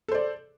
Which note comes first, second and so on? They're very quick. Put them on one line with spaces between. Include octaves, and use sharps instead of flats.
A4 C5 D5